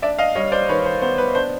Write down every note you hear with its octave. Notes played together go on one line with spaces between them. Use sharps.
D4 D5 E5
D#5 F5
G3 C#5 D#5
C5 D5
D#3 B4 C#5
C5
B3 C5
B4
D4 C5